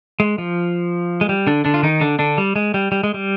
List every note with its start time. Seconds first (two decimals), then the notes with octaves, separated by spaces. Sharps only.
0.20 G#3
0.38 F3
1.21 G#3
1.29 G3
1.47 D3 D4
1.65 D3 D4
1.74 F4
1.83 D#3 D#4
2.01 D3 D4
2.19 D3 D4
2.38 G3
2.56 G#3
2.74 G3
2.92 G3
3.04 G#3
3.14 G3